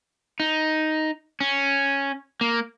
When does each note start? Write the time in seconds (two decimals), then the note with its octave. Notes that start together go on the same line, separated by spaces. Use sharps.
0.40 D#4
1.41 C#4
2.41 A#3